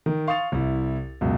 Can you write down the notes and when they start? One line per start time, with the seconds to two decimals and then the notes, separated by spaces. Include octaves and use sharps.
0.06 D#3
0.27 F5 C6 C#6 D#6 A6 F7
0.52 C2 E4
1.21 C#2 F#2 B2